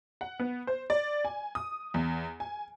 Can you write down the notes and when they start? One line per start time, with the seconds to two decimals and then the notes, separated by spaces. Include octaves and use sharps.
0.21 F#5
0.40 B3
0.67 C5
0.90 D5
1.25 G#5
1.55 D#6
1.94 E2
2.40 G#5